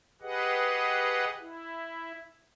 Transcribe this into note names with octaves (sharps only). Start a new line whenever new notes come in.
G4 G#4 B4 D#5 F#5
E4